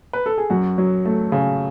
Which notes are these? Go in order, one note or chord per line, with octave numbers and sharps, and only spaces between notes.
B4
A4
G#4
F#2 F#4
F#3
A3
C#3